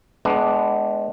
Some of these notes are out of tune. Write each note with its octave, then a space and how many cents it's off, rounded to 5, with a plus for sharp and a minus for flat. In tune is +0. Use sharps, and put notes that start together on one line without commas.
G#3 +30 B3 +15 D4 +0